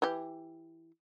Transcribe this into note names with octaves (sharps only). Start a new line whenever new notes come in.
E3 G4